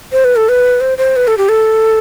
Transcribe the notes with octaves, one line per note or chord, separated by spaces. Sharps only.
C5
B4
A4
B4
C5
C5
B4
A4
G4
A4